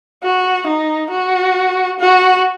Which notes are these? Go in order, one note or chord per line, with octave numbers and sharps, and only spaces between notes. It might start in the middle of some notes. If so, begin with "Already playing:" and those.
F#4
D#4
F#4
F#4